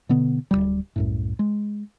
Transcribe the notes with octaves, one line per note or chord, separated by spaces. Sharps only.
B2 D3 B3
D1 B1 G3
C2 F#2 A2
G#3